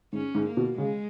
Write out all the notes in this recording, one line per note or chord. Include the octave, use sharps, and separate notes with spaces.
G#2 C#4
G#2
A#3
B2
C#3 G#3